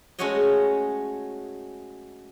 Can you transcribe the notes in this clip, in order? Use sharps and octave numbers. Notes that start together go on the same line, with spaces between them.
G#3 A3 C#4 F#4 C#5 D#5